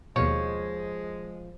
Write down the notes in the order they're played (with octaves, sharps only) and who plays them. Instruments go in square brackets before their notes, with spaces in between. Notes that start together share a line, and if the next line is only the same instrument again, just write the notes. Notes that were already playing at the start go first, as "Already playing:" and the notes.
[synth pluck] D#2 B2 [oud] F3 [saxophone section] G#3 [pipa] C#5